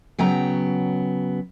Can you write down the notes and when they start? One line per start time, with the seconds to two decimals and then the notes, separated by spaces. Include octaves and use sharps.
0.18 C#3 F#3 B3 G5 A#5